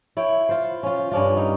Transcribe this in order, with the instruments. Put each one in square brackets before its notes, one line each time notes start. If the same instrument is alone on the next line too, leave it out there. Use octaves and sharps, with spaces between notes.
[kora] E4 C#5 G5
F4 C5
C#4 F4
G2 C#4 D4 F4
D#4